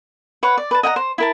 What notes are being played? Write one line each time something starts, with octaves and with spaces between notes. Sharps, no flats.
B4 C#5 F#5
D5
B4 A5
D#5 F#5 G5 A#5
C5
E4 A#4 A5